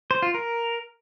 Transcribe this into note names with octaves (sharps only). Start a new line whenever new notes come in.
C5
F4
A#4